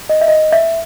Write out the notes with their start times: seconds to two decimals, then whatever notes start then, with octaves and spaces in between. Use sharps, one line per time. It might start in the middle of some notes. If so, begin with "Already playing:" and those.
0.09 D#5
0.21 E5
0.28 D#5
0.52 E5